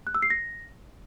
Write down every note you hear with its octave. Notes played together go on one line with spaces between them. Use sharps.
F#6
E6
C7
A#6